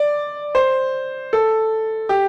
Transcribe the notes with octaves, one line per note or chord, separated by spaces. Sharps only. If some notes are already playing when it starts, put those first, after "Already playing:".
Already playing: D5
C5
A4
G4